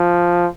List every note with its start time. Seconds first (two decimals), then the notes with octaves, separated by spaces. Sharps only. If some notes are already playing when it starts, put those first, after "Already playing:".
Already playing: F3